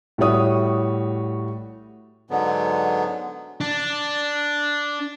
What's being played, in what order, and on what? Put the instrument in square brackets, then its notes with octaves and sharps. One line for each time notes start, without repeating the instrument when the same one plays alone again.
[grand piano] A2 G3 E4 F#4 C#5 D#6
[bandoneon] G#2 D3 F#3 B3
[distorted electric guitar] D4